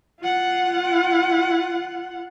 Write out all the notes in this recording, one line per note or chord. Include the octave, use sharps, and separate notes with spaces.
F4 F#5